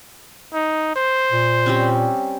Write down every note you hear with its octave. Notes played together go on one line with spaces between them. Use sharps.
D#4
C5
A#2
G3 C4 C#4